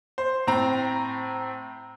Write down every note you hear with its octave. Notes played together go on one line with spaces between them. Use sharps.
C5
A2 C4 A#5